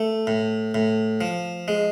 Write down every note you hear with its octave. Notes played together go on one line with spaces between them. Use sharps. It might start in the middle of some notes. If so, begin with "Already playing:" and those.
Already playing: A3
A2
A2
F3
G#3